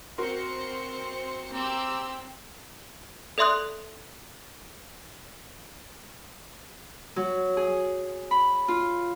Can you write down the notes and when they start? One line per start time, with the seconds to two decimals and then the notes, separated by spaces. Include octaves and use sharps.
0.18 C4 F#4 A#4 C5 C6 C#7
1.51 C4 G4 A#5 E6
3.38 A4 D5 E5 C6 D#6 F#6
7.16 F#3
7.57 G#4
8.31 B5
8.68 F4